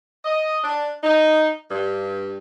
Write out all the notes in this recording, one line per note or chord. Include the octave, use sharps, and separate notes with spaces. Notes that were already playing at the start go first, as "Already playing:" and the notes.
D#5
D4
D#4
G2